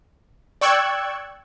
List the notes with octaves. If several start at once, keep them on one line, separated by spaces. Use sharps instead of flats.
D5 G5 C#6 E6 F#6 G#6